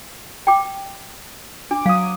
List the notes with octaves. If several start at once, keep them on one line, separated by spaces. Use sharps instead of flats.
G5 D6
D4 D6
F#3 F5 D#6